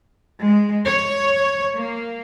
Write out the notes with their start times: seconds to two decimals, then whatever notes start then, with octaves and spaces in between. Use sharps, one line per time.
0.43 G#3
0.87 C#5
1.76 A#3